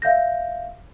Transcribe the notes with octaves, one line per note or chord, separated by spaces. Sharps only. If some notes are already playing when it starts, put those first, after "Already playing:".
E5 F5 G6 A#6